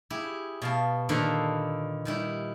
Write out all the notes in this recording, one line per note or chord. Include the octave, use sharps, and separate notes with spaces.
E4 G4 G#4
B2 F5 A5
A#2 D3 D#3 A4 B4 C5
D#3 G3 E4